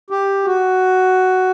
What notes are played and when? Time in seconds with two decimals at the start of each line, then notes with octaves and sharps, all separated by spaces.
0.10 G4
0.45 F#4